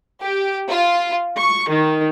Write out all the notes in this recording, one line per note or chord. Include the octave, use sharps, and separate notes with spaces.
G4
F4
C#6
D#3